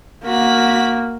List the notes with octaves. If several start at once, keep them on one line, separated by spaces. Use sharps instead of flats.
A#3 F#4 B6